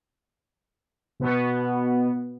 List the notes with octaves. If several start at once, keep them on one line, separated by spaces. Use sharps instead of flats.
B2 B3